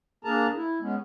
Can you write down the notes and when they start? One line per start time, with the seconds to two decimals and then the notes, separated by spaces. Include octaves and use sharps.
0.24 A#3 D4 G#4 A#4 A5 A#5
0.55 E4
0.81 G#3 B3 C#4